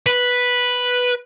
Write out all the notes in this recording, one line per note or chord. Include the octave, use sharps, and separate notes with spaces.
B4